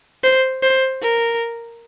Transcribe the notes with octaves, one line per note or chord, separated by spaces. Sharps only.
C5
C5
A#4